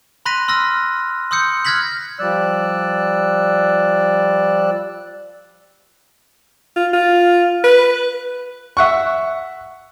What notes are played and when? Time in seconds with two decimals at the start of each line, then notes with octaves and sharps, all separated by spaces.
0.26 B5 C6 F#6 A#6 B6 D#7
0.48 C6 E6 F6 A#6
1.31 C6 D#6 E6 G6 C#7
1.65 F6 F#6 G#6 A#6 B6 F#7
2.19 F3 G3 D5 E6 F#6
6.76 F4
6.93 F4
7.64 B4
8.77 E5 F#5 C#6